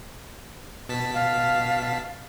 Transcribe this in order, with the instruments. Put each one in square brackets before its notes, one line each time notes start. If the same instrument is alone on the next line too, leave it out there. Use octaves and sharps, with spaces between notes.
[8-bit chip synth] B2 A5 B6
[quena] F5